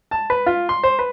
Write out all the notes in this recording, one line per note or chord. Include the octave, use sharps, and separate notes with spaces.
A5
B4
F4
C6
C5
B4